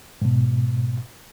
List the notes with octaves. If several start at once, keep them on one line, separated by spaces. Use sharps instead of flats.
G#2 B2